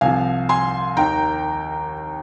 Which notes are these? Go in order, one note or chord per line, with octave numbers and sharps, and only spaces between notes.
C2 C3 F3 F5 G#5
G#5 C6
D#2 D#3 G5 A#5